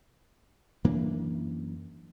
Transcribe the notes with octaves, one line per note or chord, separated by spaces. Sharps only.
F#2 E3 A#3 D4